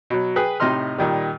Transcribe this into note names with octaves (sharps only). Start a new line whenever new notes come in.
B2 F#3
G#4 B4 G5
A2 C3 D#4 D#5 C6 F6
A#2 D#3 G3